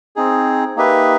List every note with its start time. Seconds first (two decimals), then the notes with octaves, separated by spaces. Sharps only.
0.16 C4 D#4 G#4
0.76 A#3 D#4 G4 B4 E5